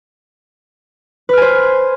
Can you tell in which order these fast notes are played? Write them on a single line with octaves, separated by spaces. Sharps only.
B4 F6 G#5 C5